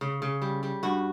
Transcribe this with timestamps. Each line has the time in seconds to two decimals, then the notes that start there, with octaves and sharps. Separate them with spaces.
0.01 C#3
0.22 C#3
0.42 G3
0.63 G3
0.83 G2 F#4